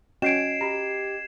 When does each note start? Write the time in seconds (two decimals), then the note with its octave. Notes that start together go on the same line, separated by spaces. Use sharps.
0.22 C#4 F#4 D#5 G5 G#6 C7 D7 E7
0.61 G4 A#5 B5